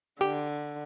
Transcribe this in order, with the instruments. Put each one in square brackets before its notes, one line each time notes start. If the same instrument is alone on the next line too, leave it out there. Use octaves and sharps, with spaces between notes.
[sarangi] D3 [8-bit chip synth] G4